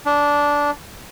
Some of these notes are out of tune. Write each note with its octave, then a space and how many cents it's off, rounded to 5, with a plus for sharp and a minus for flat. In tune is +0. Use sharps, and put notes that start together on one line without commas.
D4 -15